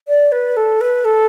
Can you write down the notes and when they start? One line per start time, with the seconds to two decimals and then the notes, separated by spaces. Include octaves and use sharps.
0.08 D5
0.32 B4
0.57 A4
0.81 B4
1.05 A4